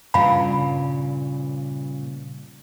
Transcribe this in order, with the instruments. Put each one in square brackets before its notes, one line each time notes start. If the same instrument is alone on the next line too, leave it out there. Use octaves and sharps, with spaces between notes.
[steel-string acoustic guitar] G2 A#2 C#3 [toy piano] F5 B5